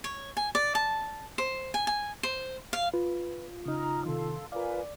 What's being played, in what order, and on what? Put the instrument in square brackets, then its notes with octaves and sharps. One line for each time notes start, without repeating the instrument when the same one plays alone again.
[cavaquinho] C#5
G#5
D5
A5
C5
G#5
G#5
C5
F5
[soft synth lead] F4 [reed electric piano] B4
[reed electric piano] C#3 D#4 [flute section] A#5 D#6 F6
[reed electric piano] C3 D#3 [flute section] A4 F5 C6
[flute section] F4 B4 G#5 [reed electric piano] A#4 F5 [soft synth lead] D5